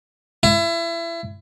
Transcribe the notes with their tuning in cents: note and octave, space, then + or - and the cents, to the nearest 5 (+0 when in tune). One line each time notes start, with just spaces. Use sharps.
E4 +30